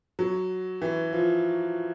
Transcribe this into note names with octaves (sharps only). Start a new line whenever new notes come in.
F#3
E3
F3